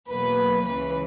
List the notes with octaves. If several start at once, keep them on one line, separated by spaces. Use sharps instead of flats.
E2 B2 F#3 A#3 B4
C#2 C#3 E3 B4